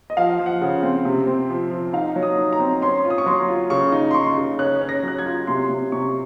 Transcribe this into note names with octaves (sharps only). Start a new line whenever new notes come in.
D#5
F3 F5
F3
F#5
C#3
C4
C3
C4
F3
F3
D#4 F5
F#3
D#6
D#4
A#5
C4
C#4 C6
F4
D#6
C#6
F#3 C6
F4
C#3 C#6
D#4
C6
D#4 C#6
C#3
C#4 F#6
C#4
A#6
F#3 F#6
G#6
F4
C3 C6
C3
C3 C#6